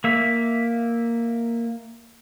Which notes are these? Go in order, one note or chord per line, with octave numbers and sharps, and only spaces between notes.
A#3 E5